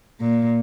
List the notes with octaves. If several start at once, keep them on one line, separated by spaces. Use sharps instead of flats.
A#2